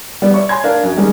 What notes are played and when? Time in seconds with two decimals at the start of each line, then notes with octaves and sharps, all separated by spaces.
0.22 G3 B3 D5
0.34 C#5 D5 E5 C#6
0.49 G#5 C6 G#6
0.64 D4 A#4 F5
0.83 F#2
0.97 D#3 G3 G#3 C#4